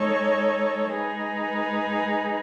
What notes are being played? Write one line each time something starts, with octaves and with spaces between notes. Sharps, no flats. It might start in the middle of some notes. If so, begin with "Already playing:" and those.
Already playing: G#3 D#4 A4 C#5
G#3 D#4 G#4 B4